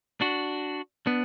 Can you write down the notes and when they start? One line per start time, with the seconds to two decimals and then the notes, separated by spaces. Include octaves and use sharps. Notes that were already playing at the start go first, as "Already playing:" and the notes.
0.21 D4 F#4
1.06 B3 D4